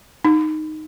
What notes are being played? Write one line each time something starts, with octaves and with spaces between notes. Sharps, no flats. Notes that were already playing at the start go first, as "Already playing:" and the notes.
D#4